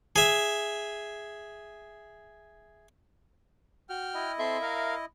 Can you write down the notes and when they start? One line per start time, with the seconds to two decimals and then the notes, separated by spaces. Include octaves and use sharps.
0.16 G#4 E5
3.89 F#4 G5 F6
4.15 E4 D#5
4.39 C4 A4 E5 C6
4.62 A#4 F5